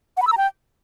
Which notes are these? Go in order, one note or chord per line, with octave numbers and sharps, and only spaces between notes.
F#5
B5
E6
A#5
G5